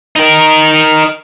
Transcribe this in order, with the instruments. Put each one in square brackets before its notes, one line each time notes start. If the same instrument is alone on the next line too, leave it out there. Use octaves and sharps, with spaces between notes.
[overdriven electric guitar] D#4 A#4